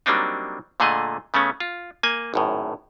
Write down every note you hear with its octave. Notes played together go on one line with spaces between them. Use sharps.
F#3 G3 A#3 C4 D4 D#4
A#2 D3 A3 G#4 D#5
C#3 A3 B3 C#4
F4
A#3 G#5
G#1 F#2 A2